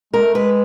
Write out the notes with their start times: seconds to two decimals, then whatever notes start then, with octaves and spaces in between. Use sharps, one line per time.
0.13 G#3 A#4
0.24 A3
0.35 G#3 B4